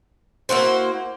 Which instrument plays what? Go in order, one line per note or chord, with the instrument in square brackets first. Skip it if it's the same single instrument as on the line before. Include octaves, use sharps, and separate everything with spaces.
[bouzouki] A#3 E4 F#4 C5